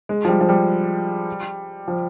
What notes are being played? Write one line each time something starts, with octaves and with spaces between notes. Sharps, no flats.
G#3
F3
G3
F3
G3
F3